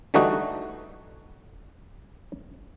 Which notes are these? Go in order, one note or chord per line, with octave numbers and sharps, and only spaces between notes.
D3 E3 G3 A3 D#4 F#4